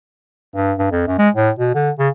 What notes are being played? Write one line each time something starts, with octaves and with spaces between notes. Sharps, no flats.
G2
G2
F2
F#2
G#3
A2
B2
D3
C#3